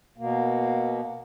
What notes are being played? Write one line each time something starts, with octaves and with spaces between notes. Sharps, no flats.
B2 A#3